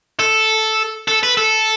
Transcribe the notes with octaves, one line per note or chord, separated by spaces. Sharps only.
A4
A4
B4
A4